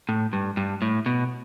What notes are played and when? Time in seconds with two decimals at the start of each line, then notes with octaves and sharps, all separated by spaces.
0.09 A2
0.33 G2
0.57 G2
0.82 A2
1.06 B2